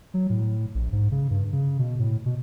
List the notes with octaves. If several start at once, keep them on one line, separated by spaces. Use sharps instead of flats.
F#3
A2
A#1
G#2
C#3
G2
C#3
B2
A2
B2